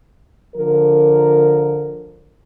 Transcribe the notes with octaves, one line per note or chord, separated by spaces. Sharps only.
D3 F3 A#4